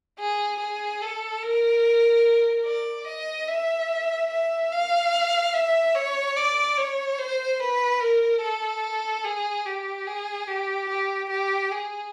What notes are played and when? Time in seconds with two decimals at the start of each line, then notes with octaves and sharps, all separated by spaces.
0.19 G#4
0.60 G#4
1.01 A4
1.42 A#4
2.66 D5
3.07 D#5
3.48 E5
4.31 E5
4.72 F5
5.54 E5
5.95 C#5
6.37 D5
6.78 C#5
7.19 C5
7.60 B4
8.01 A#4
8.42 A4
9.24 G#4
9.66 G4
10.07 G#4
10.48 G4
10.89 G4
11.30 G4
11.71 G#4